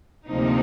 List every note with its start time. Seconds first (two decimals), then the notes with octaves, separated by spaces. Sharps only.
0.27 D2 C3 F3 A#3 D#4